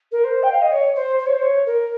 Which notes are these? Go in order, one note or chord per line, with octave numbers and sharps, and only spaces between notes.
A#4
C5
G5
F5
D#5
C#5
C5
C5
C#5
C5
C#5
A#4